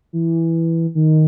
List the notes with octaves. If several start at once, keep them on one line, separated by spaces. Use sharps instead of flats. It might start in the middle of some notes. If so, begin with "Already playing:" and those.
E3
D#3